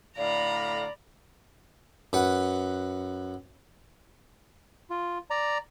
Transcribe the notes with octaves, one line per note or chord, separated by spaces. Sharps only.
A2 D3 D5 F5 A#5 B5
F#2 B4 F#5
F4
D5 A#5